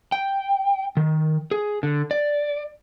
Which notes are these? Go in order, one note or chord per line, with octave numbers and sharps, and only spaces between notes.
G5
D#3
G#4
D3
D5